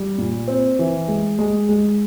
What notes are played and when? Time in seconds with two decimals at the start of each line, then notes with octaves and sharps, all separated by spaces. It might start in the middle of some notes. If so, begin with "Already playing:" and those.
Already playing: G3
0.18 A#2
0.48 C4
0.79 E3
1.08 G#3
1.39 G#3
1.69 G#3